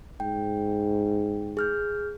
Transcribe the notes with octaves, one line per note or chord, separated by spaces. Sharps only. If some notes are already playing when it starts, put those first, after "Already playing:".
G#2 G5
G#4 F6 G6